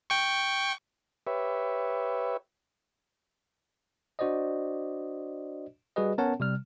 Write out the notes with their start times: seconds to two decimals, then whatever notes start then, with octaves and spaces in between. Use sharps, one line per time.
0.10 G5 C#6
1.27 G4 B4 C#5 E5
4.19 D4 F#4 C5 D5 D#5
5.96 G3 F#4 G#4 B4 D#5
6.18 B3 C#4 A#4 C#5 F#5 A5
6.40 C3 G3 F6